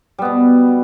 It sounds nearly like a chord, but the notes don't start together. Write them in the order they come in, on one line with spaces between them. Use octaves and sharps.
G3 B3 B2